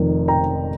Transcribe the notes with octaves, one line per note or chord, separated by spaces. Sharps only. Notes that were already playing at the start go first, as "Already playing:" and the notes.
Already playing: F1 F2 D#3
G5 A#5